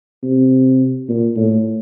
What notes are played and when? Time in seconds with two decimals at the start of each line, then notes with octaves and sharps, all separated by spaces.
0.23 C3
1.08 A#2
1.36 A2